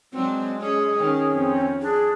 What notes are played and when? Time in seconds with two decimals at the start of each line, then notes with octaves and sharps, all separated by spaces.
0.12 F#3 G#3 C4 D4
0.60 C#4 G#4
0.99 D#3 C#4
1.31 F2 C4
1.82 D4 G#4